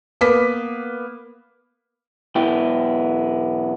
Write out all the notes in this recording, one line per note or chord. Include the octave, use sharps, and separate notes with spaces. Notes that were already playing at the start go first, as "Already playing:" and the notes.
A#3 B3 B4 D6 B6
B1 E2 B3 E4 G5